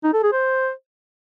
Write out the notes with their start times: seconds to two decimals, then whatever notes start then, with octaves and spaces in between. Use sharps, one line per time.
0.04 D#4
0.13 A4
0.23 G#4
0.32 C5